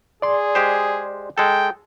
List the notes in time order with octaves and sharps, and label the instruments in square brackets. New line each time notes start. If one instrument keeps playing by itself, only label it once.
[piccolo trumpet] G#4 [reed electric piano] D5 C6
[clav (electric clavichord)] G#3 G4 C5
[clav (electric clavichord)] G#3 A4 [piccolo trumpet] G5